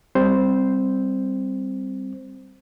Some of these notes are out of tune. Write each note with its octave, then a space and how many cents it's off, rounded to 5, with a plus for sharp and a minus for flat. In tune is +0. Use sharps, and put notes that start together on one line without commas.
G3 +0 C4 +0 C5 +0